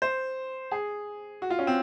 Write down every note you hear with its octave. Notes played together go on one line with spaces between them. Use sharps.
C5
G#4
F#4
F4
C#4
C4